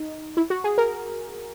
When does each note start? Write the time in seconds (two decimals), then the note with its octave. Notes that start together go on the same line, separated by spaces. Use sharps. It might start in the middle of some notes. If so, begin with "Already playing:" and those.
Already playing: D#4
0.37 E4
0.50 F#4
0.64 G#4
0.78 A#4